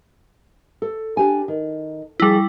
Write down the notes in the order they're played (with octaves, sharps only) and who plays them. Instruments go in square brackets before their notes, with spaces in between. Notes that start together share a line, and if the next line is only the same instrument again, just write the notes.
[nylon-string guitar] A4
D4 G4 G#5
D#3
[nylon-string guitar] D2 F3 G#4 [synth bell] G3 E4